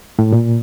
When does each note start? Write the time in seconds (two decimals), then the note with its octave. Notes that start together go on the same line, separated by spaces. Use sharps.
0.19 A2
0.32 A#2